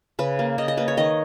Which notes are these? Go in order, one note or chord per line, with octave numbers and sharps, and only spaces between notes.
C#3 B4
A#3
C#3 D#5
D#5
A#3 B4
C#5
D#3 D#5